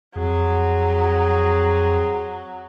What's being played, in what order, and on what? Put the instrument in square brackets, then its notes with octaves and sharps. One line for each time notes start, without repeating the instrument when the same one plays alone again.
[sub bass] F2 [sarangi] F#3 [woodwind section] C4 G#4